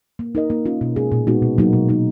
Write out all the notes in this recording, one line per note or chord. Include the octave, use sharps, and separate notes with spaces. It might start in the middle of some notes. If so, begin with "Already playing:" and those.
A#3
D#4 A#4 D#5
A#3
C#4 F4
B2
G#3 C#4 G#4
A#2
G#3 B3 D#4 F#4
B2
F#3 A#3 D#4 F#4
B2
A#3 D#4